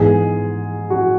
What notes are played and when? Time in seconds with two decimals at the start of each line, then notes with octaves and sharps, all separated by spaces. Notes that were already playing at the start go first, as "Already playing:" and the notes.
Already playing: G#2 E3 B3 G#4
0.90 F#4